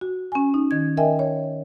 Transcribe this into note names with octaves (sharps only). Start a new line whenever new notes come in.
F#4
C#4 G#5
D#4
D#3 G#6
A#4 D#5 E5 G5 G#5
C#5